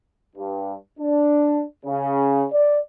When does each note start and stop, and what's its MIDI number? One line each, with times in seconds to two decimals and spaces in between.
0.36 0.74 43
0.99 1.63 62
1.85 2.45 49
2.52 2.79 74